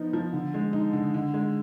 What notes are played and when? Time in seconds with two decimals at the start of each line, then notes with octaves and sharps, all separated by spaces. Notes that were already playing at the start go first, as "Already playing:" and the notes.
Already playing: F3 B3 D#4
0.13 F3
0.33 D3
0.54 G#3
0.73 D#4
0.93 D3
1.14 D3
1.34 G#3